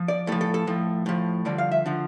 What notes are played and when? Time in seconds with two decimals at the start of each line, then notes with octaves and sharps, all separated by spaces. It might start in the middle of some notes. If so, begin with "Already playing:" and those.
Already playing: F3
0.08 D5
0.27 A2 A4
0.32 F3
0.41 A4
0.54 A4
0.67 A2 F3
1.06 A2 F3
1.45 G2 D3 F3 D5
1.58 F5
1.71 E5
1.86 D3 F3